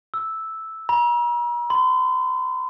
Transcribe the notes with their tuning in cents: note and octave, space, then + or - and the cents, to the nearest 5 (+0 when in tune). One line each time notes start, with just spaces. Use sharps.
E6 -5
A#5 +45
C6 -40